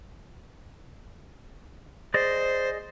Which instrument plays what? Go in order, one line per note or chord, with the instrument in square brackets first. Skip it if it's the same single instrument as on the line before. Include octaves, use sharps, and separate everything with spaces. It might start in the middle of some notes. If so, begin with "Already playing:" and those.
[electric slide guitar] G#4 D5 D#5 [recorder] C5